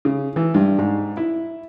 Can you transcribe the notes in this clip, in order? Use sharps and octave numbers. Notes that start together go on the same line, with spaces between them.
C#3
E3
G2
G#2
E4